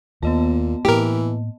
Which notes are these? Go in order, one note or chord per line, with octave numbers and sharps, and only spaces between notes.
D#2 A#2 B3 D#5 A5
A2 E3 A#3 G4 A#4